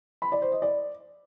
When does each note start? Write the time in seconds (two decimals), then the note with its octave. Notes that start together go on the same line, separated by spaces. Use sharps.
0.22 B5
0.32 D5
0.42 C5
0.52 D#5
0.62 D5